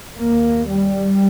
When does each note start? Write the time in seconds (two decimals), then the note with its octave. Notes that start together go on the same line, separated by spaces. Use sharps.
0.17 D#2 A#3
0.68 G3